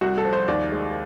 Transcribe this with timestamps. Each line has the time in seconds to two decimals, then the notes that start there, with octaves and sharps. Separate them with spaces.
0.01 C2 F#4
0.18 A4
0.24 F3
0.33 C5
0.48 D#2 D5
0.72 G#3